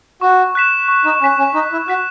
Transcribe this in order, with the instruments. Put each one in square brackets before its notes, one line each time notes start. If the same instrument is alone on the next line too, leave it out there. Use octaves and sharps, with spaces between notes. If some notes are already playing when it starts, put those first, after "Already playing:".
[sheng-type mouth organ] F#4 [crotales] C#6
[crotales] F#6 B6 E7
C#6
[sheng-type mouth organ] D#4
[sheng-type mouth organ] C#4 [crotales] F#6 B6 E7
[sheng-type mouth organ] C#4
[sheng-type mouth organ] D#4 [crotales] C#6
[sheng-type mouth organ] E4
[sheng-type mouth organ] F#4 [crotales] F#6 B6 E7